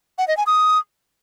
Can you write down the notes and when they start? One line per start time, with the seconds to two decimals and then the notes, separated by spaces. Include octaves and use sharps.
0.18 F#5
0.28 D#5
0.37 G#5
0.47 D#6